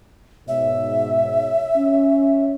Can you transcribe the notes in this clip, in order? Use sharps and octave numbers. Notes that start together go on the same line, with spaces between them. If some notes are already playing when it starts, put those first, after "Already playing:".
G#2 B2 C#5 E5
C#4